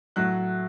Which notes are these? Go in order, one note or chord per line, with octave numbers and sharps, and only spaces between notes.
A2 F#3 F#6